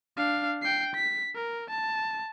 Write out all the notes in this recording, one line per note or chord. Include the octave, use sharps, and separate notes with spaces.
D4 F5
G5 C7
B6
A#4
A5